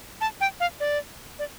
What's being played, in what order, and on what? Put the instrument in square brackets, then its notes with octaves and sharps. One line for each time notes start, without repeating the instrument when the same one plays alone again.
[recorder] A5
G5
F5
D5
D5